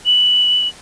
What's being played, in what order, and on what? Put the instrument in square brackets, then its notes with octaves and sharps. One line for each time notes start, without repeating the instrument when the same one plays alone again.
[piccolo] F#7